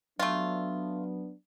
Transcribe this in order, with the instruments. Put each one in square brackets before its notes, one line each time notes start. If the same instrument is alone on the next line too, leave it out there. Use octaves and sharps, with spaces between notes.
[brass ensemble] F#3 B3 D4 [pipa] A3 F4